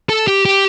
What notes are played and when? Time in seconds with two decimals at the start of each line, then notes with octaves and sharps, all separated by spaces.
0.09 A4
0.28 G4
0.45 G4